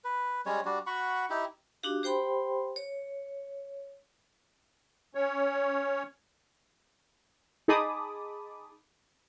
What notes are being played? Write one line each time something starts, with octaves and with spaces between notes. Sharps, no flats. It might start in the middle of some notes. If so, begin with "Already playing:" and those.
B4
G3 G#3 C#4 C#5
G3 D4 F#4
F#4 F#5 B5 C#6
D#4 E4 G4
D4 D#4 F#4 G4 F5
G4 C5 G5 B5 C6
C#5
C#4 C#5
D#4 G#4 A5 B5 D6 D#6